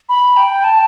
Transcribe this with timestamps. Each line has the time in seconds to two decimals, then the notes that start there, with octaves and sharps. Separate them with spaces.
0.09 B5
0.37 G5
0.64 A5